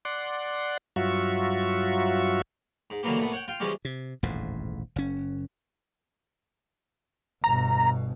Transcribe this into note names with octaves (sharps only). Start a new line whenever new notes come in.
D5 F#5 C6
G2 F#3 F4 F#4 E5 C#6
G#2
D3 E3 F#3 A#3 B3 G4
A#2 A3 B3
C#5 F#5 G5
F4 G5
E3 F3 G3 G#3 C#4 G4
C3
D#1 A1 F2 G#2
F#1 C#4
G1 B2 A#5